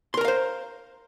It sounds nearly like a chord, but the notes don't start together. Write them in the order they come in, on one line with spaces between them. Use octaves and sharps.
C6 A#4 A#5 F5 C5